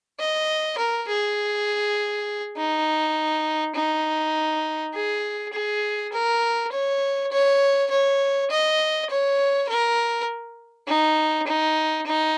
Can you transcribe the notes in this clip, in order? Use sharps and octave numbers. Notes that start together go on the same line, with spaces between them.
D#5
A#4
G#4
D#4
D#4
G#4
G#4
A#4
C#5
C#5
C#5
D#5
C#5
A#4
D#4
D#4
D#4